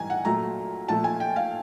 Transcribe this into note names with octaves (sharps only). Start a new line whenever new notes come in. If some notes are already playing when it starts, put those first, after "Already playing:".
Already playing: G#2 E3 G3 G#5 A#5
F#5
A#2 F#3 A3 A#5
A#2 F3 A3 A5
G#5
G5
F5